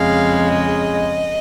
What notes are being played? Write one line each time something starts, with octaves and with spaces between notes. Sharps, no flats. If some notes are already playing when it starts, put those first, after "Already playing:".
Already playing: F2 C#3 G#3 F5
D#5